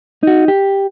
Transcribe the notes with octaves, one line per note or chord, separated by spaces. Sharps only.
D#4 F#4
G4